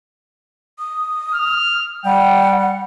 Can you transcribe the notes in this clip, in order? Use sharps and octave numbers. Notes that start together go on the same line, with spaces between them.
D#6
F6
G3 F#5 G5